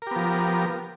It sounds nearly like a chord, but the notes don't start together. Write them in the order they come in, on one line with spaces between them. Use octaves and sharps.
A#4 G4 B3 F3